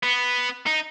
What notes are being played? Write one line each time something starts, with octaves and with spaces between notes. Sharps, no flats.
B3
D#4